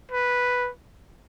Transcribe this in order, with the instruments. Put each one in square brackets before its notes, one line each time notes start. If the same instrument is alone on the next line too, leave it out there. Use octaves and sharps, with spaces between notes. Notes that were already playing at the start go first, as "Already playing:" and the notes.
[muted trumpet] B4